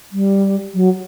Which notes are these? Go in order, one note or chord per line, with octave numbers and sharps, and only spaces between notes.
G3
F#3